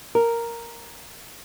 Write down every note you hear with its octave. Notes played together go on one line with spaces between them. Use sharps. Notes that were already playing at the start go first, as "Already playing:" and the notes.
A#4